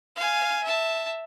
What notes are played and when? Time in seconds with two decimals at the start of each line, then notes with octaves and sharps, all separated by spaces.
0.16 F5 G#5
0.63 E5 A5